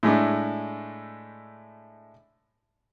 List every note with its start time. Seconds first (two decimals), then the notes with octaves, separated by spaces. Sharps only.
0.03 A2 G#3 A3 D4